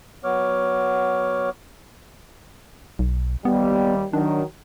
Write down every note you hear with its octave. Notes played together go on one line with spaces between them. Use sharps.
F#3 B3 C#5 D6 F6
B1
D#2 G3 B3
D#3 F#3 D4